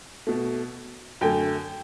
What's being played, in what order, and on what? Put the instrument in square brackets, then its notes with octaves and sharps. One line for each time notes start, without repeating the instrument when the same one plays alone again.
[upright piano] B2 A3
F#2 D3 A3 G5